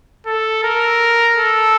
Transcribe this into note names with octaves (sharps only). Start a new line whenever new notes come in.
A4
A#4
A4